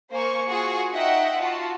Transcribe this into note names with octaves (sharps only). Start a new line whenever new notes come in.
A#3 C5 G#5 C#6
F4 F#4 G#4 G#5 C#6
D#4 D#5 E5 F#5 G5
F4 F#4 A5